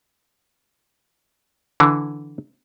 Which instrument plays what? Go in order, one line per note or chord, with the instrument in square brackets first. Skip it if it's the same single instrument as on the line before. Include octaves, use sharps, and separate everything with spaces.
[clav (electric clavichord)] D3 E3